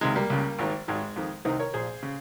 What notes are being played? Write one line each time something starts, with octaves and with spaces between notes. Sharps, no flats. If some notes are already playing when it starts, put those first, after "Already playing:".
C#2 C3 D#3 G#3
G3 A#3
C#2 C#3
G#1 G#2 D#3
G#1 G#2 D#3 G#3
F2 D#3
C2 C3 D#3 C4 D#4
A#4 C#5
A#1 A#2 G#4 C5
C#3